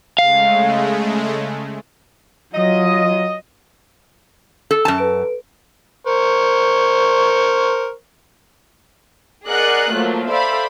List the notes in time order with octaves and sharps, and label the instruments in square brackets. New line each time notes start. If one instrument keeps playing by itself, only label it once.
[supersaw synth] C#3 G#3 A3 [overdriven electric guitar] F5
[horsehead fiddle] F#3 F4 [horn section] D#5
[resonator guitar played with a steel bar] A4
F#2 A5
[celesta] A4 B4 D7
[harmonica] A#4 C5 C#6
[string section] G#4 A#4 D5 D#5 F#5 F#6
F3 F#3 A3 A#3 F4
A4 C5 D5 E5 F5 B5